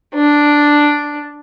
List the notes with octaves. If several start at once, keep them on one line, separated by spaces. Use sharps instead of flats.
D4